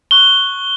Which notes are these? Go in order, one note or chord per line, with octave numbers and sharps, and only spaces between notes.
C#6 F#6 G7